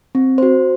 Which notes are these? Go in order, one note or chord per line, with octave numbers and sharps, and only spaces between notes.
C4
F#4 C5